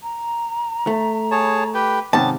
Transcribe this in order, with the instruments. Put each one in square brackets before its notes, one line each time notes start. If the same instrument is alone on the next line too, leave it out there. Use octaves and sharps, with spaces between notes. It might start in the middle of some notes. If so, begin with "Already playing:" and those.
[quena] A#5
[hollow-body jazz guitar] A3
[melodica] G#4 C#5 A5
G4 B4 G5
[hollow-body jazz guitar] D#2 G#2 C3 [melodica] B3 C#4 G4 [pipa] A5